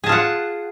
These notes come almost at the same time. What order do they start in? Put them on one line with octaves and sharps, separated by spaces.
G#4 A5 F4 F#5